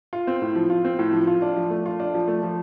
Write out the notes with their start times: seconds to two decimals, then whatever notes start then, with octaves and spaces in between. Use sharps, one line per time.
0.13 F4
0.27 C4
0.42 A2
0.55 F3
0.70 F4
0.85 C4
0.99 A2
1.13 F3
1.27 F4
1.42 D4
1.56 F3
1.70 A3
1.86 F4
2.00 D4
2.14 F3
2.28 A3
2.43 F3